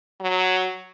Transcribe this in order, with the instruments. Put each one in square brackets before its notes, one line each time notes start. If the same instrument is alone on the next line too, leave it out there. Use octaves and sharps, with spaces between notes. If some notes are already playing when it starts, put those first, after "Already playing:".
[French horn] F#3